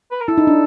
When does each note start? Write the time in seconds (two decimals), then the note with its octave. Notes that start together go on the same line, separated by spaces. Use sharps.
0.12 B4
0.21 A#4
0.28 E4 A4
0.38 D#4
0.47 D4